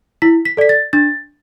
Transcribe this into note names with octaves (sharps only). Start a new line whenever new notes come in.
E4 B6
B6
A4 D5 B6
A6
D4 A6